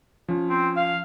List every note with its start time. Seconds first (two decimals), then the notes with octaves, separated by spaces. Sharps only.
0.29 F3 C#4
0.50 C4
0.77 F5